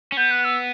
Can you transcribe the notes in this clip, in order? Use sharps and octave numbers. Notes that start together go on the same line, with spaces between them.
C#4
B3 G6
F#6
E6